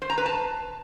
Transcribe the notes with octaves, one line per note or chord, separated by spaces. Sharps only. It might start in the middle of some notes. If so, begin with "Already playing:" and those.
C5
A#5
B4
A5